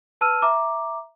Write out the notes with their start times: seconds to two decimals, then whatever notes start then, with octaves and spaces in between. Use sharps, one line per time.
0.21 B4 A5 E6 F6 D#7
0.42 E5 A#5 D6